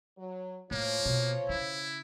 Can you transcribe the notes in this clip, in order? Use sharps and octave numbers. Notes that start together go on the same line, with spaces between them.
F#3
A2 F3 A#3 C#5
B2
C#3 E4